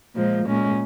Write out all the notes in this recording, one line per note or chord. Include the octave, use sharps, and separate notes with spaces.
A#2 F3 G#3
A#2 G#3 C#4